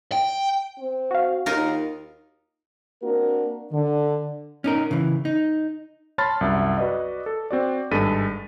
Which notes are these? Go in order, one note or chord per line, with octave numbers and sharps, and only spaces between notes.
G5
C4
F#4 F5
D#2 D#4 F4 A#4
A#3 C4 D4 F#4 A#4
D3
C#4 D#4 A#4
C#3 E3
D#4
C#5 A5 B5 C6 F6 A6
C2 F#2 E5
F#4 B4 D5 D#5
A4
C4 F#4 D5
G#1 G2 G#3 A4 B6 D#7